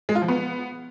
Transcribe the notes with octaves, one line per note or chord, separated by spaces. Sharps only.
G#3
F4
F3
B3